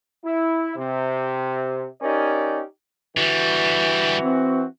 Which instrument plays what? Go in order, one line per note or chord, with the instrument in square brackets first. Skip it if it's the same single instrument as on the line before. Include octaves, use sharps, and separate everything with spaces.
[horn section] E4
C3
C#4 D#4 G4 A#4 D5
[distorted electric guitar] D3 G3 [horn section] E3 F#4
[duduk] C4